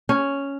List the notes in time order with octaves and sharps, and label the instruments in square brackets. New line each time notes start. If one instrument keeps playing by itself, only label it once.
[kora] C#4